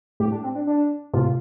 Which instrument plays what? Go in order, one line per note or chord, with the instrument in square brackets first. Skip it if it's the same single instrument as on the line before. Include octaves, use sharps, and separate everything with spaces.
[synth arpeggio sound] A2 [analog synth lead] G4
[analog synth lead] D4
C4
D4
D4
[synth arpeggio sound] A2 C3 [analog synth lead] F4